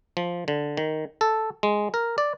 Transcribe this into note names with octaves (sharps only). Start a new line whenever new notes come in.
F3
D3
D#3
A4
G#3
A#4
D5